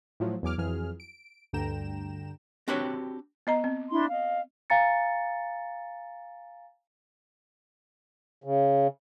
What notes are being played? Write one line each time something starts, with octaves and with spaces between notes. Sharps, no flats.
A2 F3 F#3
E2 F#3 G#5 D6 F6
F2 E3 F#3 G#4 F6
D7
D2 G2 D3 G5 A#5 E7
C4 D4 F#4 G4 B4 C#5
B3 D#5 A#5
C4
D4 E4 C6
D#5 F5
F5 G#5 A#5 A6 C#7
C#3